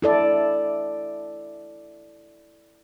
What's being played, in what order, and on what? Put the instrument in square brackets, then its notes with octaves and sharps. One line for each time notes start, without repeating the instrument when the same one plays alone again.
[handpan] E4 A4 D5